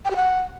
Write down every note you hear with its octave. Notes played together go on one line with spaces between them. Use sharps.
G5
G4
F#5